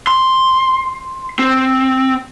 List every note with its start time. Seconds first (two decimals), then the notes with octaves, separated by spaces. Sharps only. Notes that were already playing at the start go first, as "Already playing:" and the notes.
0.07 C6
1.39 C4